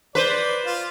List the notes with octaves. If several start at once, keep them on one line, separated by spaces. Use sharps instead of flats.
B4 C5 D5
F4